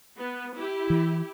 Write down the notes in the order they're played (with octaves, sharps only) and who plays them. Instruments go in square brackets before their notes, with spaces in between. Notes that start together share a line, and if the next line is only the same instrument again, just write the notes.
[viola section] B3
E4 G4
[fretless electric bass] E3